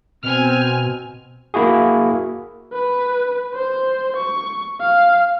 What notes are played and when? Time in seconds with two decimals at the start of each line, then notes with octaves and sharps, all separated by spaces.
0.23 B2 C4 G#5 F6
1.54 A#3 E4 F#4 G#4
2.73 B4
3.55 C5
4.16 C#6
4.81 F5